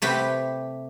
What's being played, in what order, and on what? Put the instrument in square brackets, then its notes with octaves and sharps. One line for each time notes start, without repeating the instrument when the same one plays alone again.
[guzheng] C3 A3 G4 B4